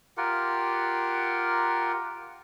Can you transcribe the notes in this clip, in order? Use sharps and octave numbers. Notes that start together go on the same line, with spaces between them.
F4 G4 A#4 F#5